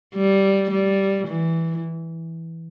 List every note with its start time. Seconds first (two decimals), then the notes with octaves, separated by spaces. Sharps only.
0.15 G3
0.71 G3
1.27 E3